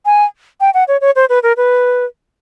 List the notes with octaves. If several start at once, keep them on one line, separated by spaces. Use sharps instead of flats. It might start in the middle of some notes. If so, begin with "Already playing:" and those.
G#5
G5
F#5
C#5
C#5
C5
B4
A#4
B4